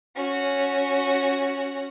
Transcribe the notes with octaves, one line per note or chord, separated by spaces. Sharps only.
C#4 F#4